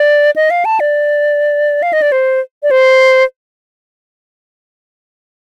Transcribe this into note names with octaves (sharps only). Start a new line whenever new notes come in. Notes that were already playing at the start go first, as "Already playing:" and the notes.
Already playing: D5
D#5
F5
A5
D5
F5
D#5
D5
C5
D5
C5